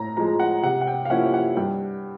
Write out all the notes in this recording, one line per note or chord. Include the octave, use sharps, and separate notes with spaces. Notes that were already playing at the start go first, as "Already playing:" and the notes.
Already playing: A2 A#5
F3 G#3 A#5
F#5
C3 F#5
F#5
G5
F5
F3 A#3 C#4 E4 F#5
F#5
G2 G5